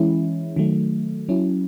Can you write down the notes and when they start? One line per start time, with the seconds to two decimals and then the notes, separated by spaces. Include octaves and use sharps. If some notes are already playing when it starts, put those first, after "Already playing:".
Already playing: E3 G#3 C#4 E4
0.56 D#3 F#3 A3
1.29 F#3 C#4 E4